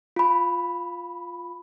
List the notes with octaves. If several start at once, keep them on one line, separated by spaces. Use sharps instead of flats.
F4 B5